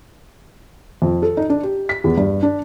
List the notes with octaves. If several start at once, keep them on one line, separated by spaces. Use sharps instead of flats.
F2
A4
D#4
D4
G4
B6
E2
G2
D4